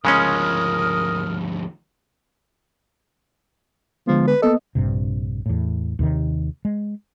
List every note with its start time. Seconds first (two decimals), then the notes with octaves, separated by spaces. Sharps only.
0.05 D2 C#3 F3 G#3 C#4 A#4 D#6 F6
4.07 D3 F3 G#3 B3
4.27 B4
4.42 A#3 B3 A4 D#5
4.75 A#1 G2 C3
5.46 E2 A2
5.99 D#2 C3 D#3
6.65 G#3